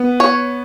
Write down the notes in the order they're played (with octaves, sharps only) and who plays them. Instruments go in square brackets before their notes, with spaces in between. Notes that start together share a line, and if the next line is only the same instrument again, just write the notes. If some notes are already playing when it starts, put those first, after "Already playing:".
Already playing: [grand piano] B3
[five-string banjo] C#5